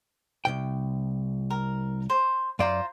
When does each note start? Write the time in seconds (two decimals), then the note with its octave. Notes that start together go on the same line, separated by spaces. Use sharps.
0.45 C2 A#2 G5
1.50 A#4
2.10 C5
2.59 F#2 F4 C5 D5 A#5